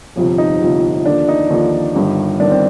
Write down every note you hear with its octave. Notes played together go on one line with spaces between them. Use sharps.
G1 F2 C3 F3
D#4
G1 F2 C3 F3
D#2 D3 F3 D4
D#4
D#2 D3 F3
G1 G2 D#3
G1 G2 D#3 D4
C4